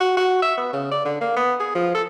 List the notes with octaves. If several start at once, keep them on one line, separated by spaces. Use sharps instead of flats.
F#4
F#4
E5
B3
C#3
D5
D3
A#3
B3
G#4
F3
A4